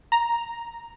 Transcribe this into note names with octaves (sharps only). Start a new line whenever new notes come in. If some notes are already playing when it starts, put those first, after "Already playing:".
A#5